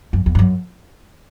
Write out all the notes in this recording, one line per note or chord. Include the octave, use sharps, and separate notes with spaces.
F#2
E2
G2
F#2